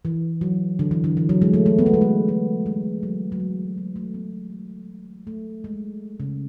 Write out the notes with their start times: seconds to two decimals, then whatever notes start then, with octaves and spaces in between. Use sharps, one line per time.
0.05 E3
0.41 F#3
0.79 D3
0.91 E3
1.04 D3
1.17 E3
1.29 F#3
1.42 G#3
1.54 A3
1.66 A3
1.79 B3
1.86 A3
1.94 G#3
2.01 A3
2.28 A3
2.66 G#3
3.03 F#3
3.32 F#3
3.40 G#3
3.78 A3
3.96 A3
4.14 B3
5.27 A3
5.64 G#3
6.20 C#3